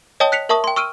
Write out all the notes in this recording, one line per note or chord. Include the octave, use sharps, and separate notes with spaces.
C#5 D#5 G5 A5 D#6 G7
F#6 B6 C#7 F7
A#4 E5 A5 C#6 D#6
G5 C6
C#6 E6 F6 D7 D#7